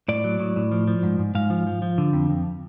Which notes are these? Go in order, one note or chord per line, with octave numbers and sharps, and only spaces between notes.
A2 D5
F#3
A2
A2
F3
F3
G#2
G#2
G#2 F5
F3
F3
F3
D3
F2
F2